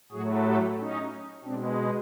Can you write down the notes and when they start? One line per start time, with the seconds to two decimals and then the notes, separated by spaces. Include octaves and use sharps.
0.12 A2 F#3 A3 F#4 G#4
0.45 G4 A4
0.78 C#4 D#4
1.44 B2 G#3 C4 D4